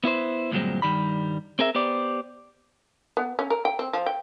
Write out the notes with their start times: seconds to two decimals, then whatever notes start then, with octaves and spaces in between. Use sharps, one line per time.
0.04 B3 E4 B4 C5
0.51 D2 G2 A#2 F#3 G#3 C4
0.82 G2 D#3 G3 B5
1.59 C4 G#4 A#4 E5
1.75 B3 G4 C5 D5
3.17 B3
3.39 C#4
3.50 A#4
3.65 G5
3.79 C4
3.93 F3
4.06 G5